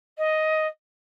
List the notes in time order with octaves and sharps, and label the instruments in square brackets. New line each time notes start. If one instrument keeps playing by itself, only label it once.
[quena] D#5